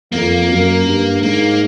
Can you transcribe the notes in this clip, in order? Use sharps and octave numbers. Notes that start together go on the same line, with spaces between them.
F2 A#3
F#2
G2
G#2 A#3